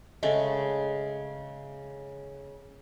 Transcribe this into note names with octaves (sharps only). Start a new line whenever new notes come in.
C#3 G#3 A3